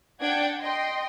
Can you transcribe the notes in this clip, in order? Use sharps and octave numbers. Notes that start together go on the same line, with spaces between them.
D4 D5 F#5 G5 G#6 D7
D#5 G5 C6